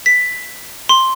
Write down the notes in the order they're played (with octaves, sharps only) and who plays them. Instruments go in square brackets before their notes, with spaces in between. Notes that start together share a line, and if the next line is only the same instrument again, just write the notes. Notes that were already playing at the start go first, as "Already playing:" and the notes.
[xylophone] B6
C6